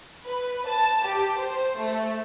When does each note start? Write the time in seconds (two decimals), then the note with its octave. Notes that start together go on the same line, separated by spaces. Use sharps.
0.25 B4
0.67 A5
1.05 G4
1.39 C5
1.78 A3